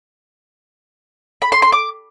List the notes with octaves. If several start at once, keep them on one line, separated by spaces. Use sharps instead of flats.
B5
C6
C6
D6